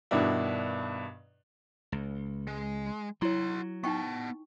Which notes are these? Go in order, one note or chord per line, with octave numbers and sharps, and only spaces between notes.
G2 B2 D#3 D4 E4
C#2
G#3
F#3 E4 F#4 C#5 C6
B3 D#4 G5 A5 C#6